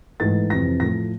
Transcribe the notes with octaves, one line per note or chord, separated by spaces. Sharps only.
G#2 E3 A3 A6
F2 C3 E3 A#6
A2 F3 A3 A#6